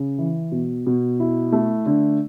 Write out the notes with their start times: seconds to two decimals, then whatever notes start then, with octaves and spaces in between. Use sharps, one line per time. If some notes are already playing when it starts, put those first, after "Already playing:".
Already playing: C#3
0.18 E3
0.52 B2
0.86 B2
1.20 E4
1.52 A3
1.86 D3